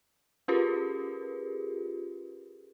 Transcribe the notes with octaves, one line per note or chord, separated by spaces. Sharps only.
C#4 F4 G4 G#4 A#4 B4